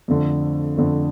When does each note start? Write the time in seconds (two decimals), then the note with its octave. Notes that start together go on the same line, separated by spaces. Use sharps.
0.08 F2 D3 A3
0.77 F2 D3 A3